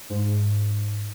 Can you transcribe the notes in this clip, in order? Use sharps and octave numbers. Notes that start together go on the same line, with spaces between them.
G#2